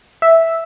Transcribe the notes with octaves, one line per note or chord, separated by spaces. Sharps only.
E5